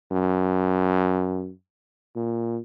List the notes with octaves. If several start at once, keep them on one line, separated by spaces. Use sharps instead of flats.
F#2
A#2